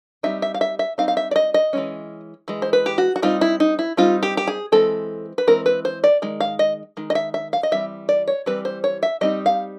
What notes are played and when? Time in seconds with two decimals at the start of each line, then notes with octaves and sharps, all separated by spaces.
0.23 G3 C4 D#4 E5
0.42 E5
0.54 F5
0.61 E5
0.79 E5
0.98 G3 C4 D#4 F5
1.08 F5
1.17 E5
1.31 D5
1.36 D#5
1.54 D#5
1.73 E3 G#3 C#4
2.48 E3 G#3
2.62 C5
2.73 B4
2.86 G4
2.98 F#4
3.16 F#4
3.22 G3 C4 D#4 F4
3.41 E4
3.60 D#4
3.79 E4
3.97 G3 C4 D#4 F4
4.23 G4
4.37 G4
4.48 G#4
4.72 E3 G#3 C4 A4
5.38 B4
5.47 E3 G#3 C4 A#4
5.66 B4
5.85 C5
6.04 D5
6.22 D#3 G#3
6.40 F5
6.59 D#5
6.97 D#3 G#3
7.10 D#5
7.15 E5
7.34 E5
7.53 F5
7.63 D#5
7.71 E3 G3 C4 E5
8.09 D5
8.28 C#5
8.46 E3 G3 C4 B4
8.65 C5
8.84 C#5
9.03 E5
9.21 G3 C4 D#4 D#5
9.46 F5